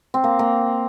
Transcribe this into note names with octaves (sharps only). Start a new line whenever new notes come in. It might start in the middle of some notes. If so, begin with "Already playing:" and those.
C4
A#3
A#3